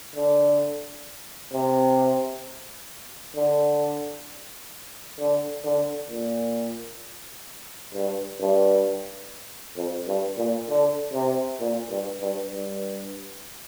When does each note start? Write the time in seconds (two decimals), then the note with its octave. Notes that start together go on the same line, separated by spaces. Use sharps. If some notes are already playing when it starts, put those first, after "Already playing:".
0.15 D3
1.53 C3
3.35 D3
5.19 D3
5.64 D3
6.10 A#2
7.94 G2
8.39 G2
9.76 F2
10.07 G2
10.38 A#2
10.68 D3
11.13 C3
11.60 A#2
11.90 G2
12.21 G2
12.51 G2